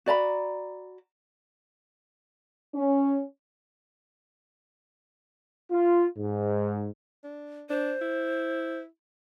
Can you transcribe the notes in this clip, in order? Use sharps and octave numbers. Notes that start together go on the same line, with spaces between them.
F#4 D5 A#5 B5
C#4
F4
G#2
D4
D4 C5
E4